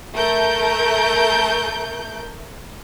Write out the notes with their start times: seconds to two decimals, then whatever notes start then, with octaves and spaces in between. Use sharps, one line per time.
0.16 A3 A4 A#4 G6